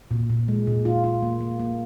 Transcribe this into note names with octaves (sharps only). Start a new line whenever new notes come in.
A#2
A#2
G#3
A#2
F4
F4
A#3
A#3
A#3